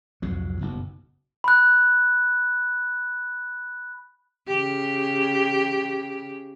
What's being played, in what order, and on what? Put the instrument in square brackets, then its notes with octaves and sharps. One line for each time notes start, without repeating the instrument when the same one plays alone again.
[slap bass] C2 F2 G#2 F#3
F#1 B1
[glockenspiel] B5 F#6
[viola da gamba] C#3 G4